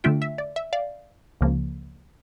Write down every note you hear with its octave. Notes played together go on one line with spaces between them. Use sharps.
D3 A3 D4 F4 E5 G5
E5
D5
E5
D5 F5
C#2 C#3 F3 A#3